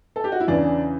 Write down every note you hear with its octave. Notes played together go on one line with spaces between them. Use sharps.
A4
G4
F#4
E4
E2 C#3 E3 D4